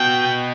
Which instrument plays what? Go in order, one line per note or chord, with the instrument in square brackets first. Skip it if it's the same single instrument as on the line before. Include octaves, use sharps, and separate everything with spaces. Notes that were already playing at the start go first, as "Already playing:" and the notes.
Already playing: [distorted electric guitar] B2 [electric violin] G5